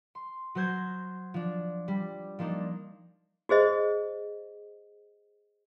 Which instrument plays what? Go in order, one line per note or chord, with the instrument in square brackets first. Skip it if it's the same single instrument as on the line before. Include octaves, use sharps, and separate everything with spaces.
[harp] C6
F#3 F#4 C5 G6 G#6
F3 D4
G3
F3 A#3 D4 D#4
[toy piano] F#4 G#4 C5 D#5